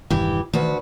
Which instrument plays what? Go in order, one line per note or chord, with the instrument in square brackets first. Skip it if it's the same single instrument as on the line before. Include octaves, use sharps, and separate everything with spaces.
[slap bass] E1 G2 D#3 [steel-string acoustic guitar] E3 G4
[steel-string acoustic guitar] D2 F#4 B4 [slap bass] D#3 E3